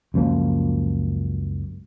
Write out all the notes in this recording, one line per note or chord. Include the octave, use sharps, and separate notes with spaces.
C#2 F#2 F3 A#3